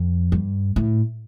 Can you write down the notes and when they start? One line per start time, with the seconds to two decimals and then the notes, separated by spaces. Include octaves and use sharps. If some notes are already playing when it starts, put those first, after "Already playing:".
Already playing: F2
0.32 G2
0.76 A2